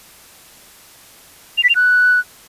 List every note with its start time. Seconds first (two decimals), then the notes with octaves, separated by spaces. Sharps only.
1.57 F7
1.63 B6
1.69 F7
1.75 F#6